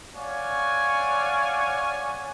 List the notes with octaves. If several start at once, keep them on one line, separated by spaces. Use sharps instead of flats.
C#5 D5 F5 F#5 G#5